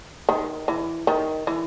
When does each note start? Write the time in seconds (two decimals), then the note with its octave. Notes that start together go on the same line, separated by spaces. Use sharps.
0.29 D#3
0.68 E3
1.07 D#3
1.47 E3